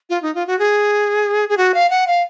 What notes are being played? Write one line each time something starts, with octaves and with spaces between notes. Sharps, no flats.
F4
D#4
F4
F#4
G#4
G#4
F#4
F5
F#5
F5